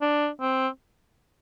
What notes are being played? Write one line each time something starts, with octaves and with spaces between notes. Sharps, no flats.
D4
C4